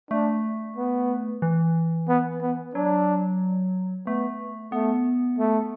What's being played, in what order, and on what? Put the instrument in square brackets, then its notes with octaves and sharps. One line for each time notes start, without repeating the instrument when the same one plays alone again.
[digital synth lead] A3 [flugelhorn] D4
[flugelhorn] B3
[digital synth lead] E3
[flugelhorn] B3
B3
[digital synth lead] F#3 [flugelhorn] D4
[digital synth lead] A3 [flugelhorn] B3
[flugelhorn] A3 [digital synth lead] B3
[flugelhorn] A3